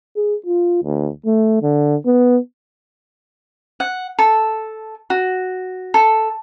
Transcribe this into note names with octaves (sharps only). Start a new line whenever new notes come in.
G#4
F4
D2
A3
D3
B3
F#5
A4
F#4
A4